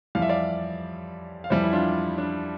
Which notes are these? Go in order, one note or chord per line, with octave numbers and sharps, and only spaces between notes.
F2 E3 G3 F5
E5
D5 F5
F5
F2 E3 G3 C5 E5
E4
D4 F4
D4